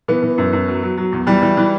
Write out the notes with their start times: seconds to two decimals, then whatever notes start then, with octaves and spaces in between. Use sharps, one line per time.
0.08 E3 B3
0.23 E3
0.38 F#2
0.53 F#2
0.68 F#3
0.83 F#3
0.97 F#3
1.12 E2
1.27 E3 G3
1.42 E3
1.57 E3